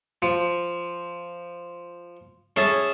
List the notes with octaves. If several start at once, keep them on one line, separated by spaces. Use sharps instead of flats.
F3
C#4 G#4 E5 A5